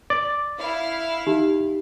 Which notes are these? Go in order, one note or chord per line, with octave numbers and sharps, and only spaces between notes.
D5
E4 F5
D#4 G4